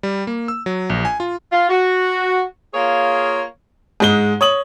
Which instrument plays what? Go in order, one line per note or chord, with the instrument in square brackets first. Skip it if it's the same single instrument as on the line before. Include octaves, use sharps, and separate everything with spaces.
[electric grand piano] G3
A#3
E6
F#3
A#1
G#5
F4
[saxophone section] F4
F#4
A#3 F4 G#4 C#5
[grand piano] G#2 G#3 G7
C#5 D#6 F#7